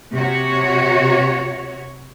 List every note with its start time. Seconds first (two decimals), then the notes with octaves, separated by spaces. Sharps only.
0.14 C3 F#4 C#5